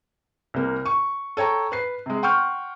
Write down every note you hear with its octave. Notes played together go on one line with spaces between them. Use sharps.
C2 A#3
C#6
A4 C#5 G5 A#5
B4 C7
C3 G#3
F#5 G5 C6 C#6 F6 G6